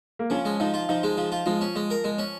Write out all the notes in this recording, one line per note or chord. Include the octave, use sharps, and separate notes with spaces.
A#3
F3 C#4
G#3
F3 D#4
F4
F3 D#4
G#3
F3
F4
F3 G#3
C#4
G#3
A#4
G#3
C#4